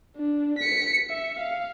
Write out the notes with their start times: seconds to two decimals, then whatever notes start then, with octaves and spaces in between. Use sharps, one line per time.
0.16 D4
0.59 B6 C#7
1.10 E5
1.39 F5